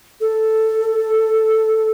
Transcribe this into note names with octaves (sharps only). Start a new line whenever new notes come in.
A4